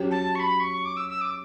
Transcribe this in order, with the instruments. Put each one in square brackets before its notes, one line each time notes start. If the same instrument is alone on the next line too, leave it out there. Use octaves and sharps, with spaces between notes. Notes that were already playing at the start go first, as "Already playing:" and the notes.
Already playing: [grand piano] F#3 C#4 G4
[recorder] A5
C#6
B5
C#6
D6
E6
E6
D6